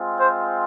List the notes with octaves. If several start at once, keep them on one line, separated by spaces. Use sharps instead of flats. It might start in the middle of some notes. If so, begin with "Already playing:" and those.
Already playing: G#3 C4 F4
C5